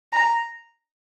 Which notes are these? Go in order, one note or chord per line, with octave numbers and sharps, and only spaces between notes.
A#5